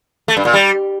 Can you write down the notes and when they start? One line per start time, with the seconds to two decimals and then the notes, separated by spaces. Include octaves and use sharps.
0.28 A3
0.37 G2
0.45 A#2
0.54 G3